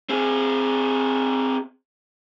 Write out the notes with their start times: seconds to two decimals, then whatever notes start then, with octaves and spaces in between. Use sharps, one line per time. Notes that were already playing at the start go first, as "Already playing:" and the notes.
0.09 C4 G#4